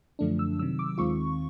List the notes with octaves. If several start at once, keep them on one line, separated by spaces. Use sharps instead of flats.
F#2 D3 F3 A3 D4
E6
C3 D#3 F#3 E6
D6
D#2 D#3 G#3 C4 F4 C#6